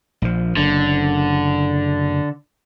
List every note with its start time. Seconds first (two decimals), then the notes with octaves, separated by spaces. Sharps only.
0.22 A#1 F3
0.57 F#1 D3